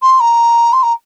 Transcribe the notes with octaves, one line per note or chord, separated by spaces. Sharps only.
C6
A#5
C6
A#5